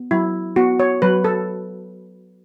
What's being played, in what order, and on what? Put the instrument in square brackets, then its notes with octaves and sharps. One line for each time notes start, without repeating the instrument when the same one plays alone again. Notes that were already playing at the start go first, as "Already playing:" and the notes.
Already playing: [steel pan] B3
F#3 E4
B3 F#4
C#5
F#3 B4
A4